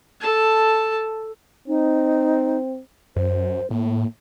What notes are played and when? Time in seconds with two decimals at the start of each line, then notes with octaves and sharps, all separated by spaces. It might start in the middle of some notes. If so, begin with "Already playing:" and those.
0.20 A4 A5
1.68 C4 D#4
3.16 F#2 C5
3.70 A2 A#3